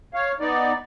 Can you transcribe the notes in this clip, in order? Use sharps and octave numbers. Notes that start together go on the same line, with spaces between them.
C#5 F5
B3 D#4 D5